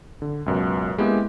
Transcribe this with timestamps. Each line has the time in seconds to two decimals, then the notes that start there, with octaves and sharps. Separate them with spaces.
0.22 D3
0.46 C#2 F#2 B2
0.98 G#3 A#3 B3 C#4 E4 G4